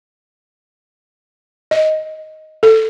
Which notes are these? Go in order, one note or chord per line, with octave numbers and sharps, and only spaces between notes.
D#5
A4